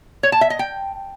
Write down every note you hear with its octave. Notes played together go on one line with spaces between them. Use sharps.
C#5
A5
E5
D#5
G5